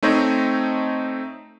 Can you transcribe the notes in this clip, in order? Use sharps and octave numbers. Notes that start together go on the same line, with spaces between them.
A3 C4 D#4 C5 C#5 D#5